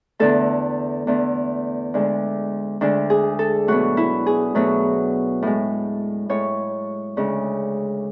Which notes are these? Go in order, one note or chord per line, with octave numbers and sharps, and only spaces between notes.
E2 D3 A3 A4
E2 D3 A3
D2 D3 G#3
D2 D3 G#3 D4
G#4
A4
B2 F#3 A3 F#4
E4
G#4
B2 F#3 A3
A2 G#3
A2 G#3 C#5
D2 C#3 G#3